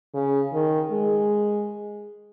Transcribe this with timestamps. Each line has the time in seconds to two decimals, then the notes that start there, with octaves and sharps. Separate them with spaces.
0.14 C#3
0.53 D#3
0.91 G#3